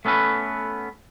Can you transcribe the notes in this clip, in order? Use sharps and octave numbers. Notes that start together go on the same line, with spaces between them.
A3 B3 C#4 A4 B4